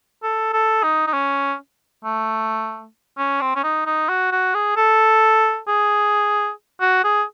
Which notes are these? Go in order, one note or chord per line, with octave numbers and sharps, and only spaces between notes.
A4
A4
D#4
D#4
C#4
A3
C#4
C4
C#4
D#4
D#4
F#4
F#4
G#4
A4
G#4
F#4
G#4